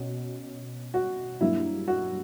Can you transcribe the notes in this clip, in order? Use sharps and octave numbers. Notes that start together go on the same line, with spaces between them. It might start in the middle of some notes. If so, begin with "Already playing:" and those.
Already playing: B2 C#4 F#4
F#4
G2 F#3 A#3 D4 E4
F#4